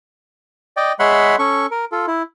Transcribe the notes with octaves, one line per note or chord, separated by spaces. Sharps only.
D5 D#5 G5
G#3 C#5 E5 F#5 B5 C6
C#4 A4 C#6
A#4
F4 A4
E4